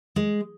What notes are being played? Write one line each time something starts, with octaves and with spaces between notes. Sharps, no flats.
G#3